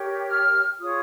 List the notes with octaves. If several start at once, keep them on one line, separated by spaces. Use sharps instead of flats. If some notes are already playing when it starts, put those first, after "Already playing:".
Already playing: G4 A#4 C#5
F6
F4 G#4 C#5 D#6